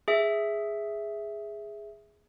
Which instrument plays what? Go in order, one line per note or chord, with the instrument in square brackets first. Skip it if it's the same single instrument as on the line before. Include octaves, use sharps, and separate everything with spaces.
[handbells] G#4 E5